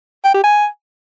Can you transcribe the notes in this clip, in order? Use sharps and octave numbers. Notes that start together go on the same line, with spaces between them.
G5
G4
G#5